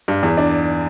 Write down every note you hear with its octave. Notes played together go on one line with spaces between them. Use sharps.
G2
E2
D4